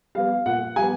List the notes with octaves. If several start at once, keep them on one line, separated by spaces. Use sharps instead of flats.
G3 B3 F5
A#2 F#5
G3 G#5
B3